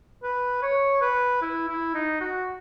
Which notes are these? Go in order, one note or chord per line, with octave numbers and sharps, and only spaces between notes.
B4
C#5
B4
E4
E4
D#4
F#4